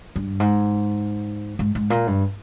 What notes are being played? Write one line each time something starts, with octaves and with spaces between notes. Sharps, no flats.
G2
G#2
G#2
G#2
A#2
G2